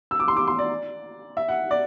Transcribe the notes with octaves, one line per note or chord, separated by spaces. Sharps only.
E6
D6
C6
D6
C6
D5
E5
F#5
D5